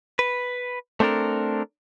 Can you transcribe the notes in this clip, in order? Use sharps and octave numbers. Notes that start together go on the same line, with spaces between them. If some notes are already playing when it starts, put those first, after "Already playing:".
B4
A3 C4 D4 A4 A#4